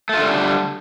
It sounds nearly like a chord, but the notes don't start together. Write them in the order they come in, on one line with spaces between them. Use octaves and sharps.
A3 F4 D3 G3